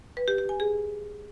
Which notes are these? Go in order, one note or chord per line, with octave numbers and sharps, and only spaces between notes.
B4
G4
G4
G#5
G#4